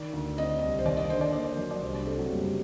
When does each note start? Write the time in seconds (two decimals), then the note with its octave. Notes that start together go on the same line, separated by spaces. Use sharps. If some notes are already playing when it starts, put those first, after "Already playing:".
Already playing: D#3 D5
0.13 D2
0.38 C4 D#5
0.59 C2 D#5
0.79 C5
0.85 D#2 D5
0.97 D#5
1.09 D3 C5
1.21 D5
1.33 A#3 D5
1.57 F#3
1.71 D5
1.82 C2 C5
1.94 D4
2.06 A3 C4
2.18 F#3
2.29 F#1 G3